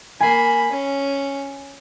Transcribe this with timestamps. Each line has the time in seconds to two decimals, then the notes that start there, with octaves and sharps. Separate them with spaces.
0.20 A#3 G#5 B5 C7
0.72 C#4